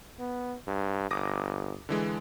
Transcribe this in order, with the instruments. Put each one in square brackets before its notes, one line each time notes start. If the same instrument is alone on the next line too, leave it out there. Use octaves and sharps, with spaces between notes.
[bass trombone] B3
G2
[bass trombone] G1 [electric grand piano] D6 D#6 A#6
[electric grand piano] D3 E3 G#3